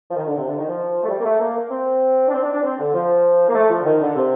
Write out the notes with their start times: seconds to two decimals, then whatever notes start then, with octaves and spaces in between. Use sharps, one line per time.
0.11 F3
0.16 D#3
0.27 D3
0.38 C3
0.48 D3
0.58 D#3
0.69 F3
1.04 A3
1.09 G3
1.19 A#3
1.25 A3
1.40 A#3
1.56 A#3
1.71 C4
2.28 D4
2.32 C4
2.42 D4
2.53 D4
2.63 C4
2.78 D3
2.94 F3
3.49 A#3
3.54 A3
3.70 F3
3.78 D3
3.85 D#3
4.01 D3
4.16 C3